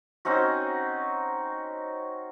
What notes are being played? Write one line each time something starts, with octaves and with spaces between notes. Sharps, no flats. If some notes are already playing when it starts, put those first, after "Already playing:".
C4 C#4 D#4 F#4